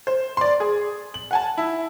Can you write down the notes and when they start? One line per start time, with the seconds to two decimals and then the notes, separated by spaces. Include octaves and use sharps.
0.07 C5
0.37 D5 C6
0.60 G#4
1.14 F#7
1.31 F#5 G#5 A5
1.58 E4